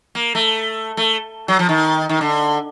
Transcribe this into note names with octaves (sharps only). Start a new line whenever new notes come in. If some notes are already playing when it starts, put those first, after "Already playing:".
A#3
A3
A3
F#3
F3
D#3
D#3
D3